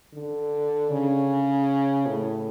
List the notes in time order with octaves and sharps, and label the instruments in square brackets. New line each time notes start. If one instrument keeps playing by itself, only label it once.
[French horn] D3
C#3
A2